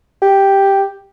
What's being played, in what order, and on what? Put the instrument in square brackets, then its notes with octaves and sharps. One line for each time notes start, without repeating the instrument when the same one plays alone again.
[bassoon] G4